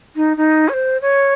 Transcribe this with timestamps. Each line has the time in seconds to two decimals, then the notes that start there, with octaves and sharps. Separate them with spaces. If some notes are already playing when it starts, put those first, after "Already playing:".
0.15 D#4
0.36 D#4
0.68 C#5
0.73 C5
1.01 C#5